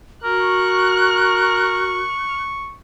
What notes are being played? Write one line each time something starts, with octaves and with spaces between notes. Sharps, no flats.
F#4 A#4 C#6 F#6